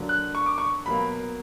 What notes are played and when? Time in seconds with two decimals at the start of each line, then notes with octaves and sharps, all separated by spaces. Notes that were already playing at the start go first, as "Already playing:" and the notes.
Already playing: D3 F#3 A#3
0.09 F#6
0.35 C#6
0.46 D6
0.58 C#6
0.86 B2 F#3 A#3 B5